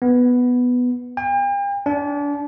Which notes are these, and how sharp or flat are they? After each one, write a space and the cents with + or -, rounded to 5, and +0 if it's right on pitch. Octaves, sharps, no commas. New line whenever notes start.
B3 +0
G5 +40
D4 -30